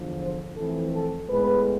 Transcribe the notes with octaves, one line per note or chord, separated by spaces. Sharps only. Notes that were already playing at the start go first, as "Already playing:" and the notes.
Already playing: E2 D3 F3
C5
F2 E3 A3 C4 A4
A4
A2 G#3 B3 B4